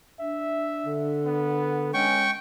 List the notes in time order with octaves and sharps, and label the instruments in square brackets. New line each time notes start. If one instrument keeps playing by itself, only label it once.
[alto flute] D4 [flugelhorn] E5
[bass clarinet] D3
[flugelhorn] B3
[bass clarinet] G#3 [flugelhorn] C#4 [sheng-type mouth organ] G5 C#6